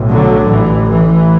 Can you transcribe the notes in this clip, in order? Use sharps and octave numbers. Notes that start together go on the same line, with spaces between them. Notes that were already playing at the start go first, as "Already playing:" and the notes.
Already playing: B1 A2
D3 F#3
A1 A2 E3
E3